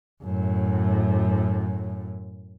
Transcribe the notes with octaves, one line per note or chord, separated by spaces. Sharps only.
F#2 A2